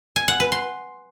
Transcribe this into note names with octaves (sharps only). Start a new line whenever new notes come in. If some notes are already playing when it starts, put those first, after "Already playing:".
G#5
F#5
B4
C6